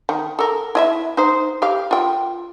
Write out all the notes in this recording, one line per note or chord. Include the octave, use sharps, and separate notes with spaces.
D#3
A4 A#4
E4 D#5 E5
D#4 C5
G4 F5
F4 G5